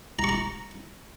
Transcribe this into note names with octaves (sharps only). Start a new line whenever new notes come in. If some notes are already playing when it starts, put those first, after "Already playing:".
A#5
C#6
A#5